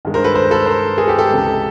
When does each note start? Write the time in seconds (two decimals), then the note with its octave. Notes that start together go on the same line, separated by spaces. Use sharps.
0.05 G2 D#3 G#3
0.14 A#4 C5
0.24 A4 B4
0.35 A#4 C5
0.51 A4 B4
0.66 A#4 C5
0.98 G#4 A#4
1.08 G4 A4
1.18 G4 A4
1.29 C#2 C3 E3 G#3